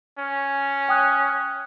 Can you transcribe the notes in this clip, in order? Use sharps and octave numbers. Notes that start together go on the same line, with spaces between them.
C#4
G5 D#6 F#6